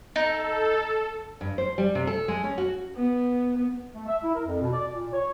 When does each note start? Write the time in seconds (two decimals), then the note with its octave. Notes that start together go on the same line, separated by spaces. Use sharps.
0.16 D#4 A4
1.41 G2
1.58 C5
1.78 G3
1.95 C3
2.07 A4
2.28 G#3
2.44 C#4
2.58 F#4
2.96 B3
3.95 A3
4.07 E5
4.23 E4
4.35 A#4
4.47 F2
4.61 B2
4.73 D5
4.93 A#2
5.13 C#5